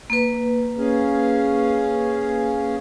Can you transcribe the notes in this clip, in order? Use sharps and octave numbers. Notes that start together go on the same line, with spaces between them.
A#3 B4
C#4 G#4 F5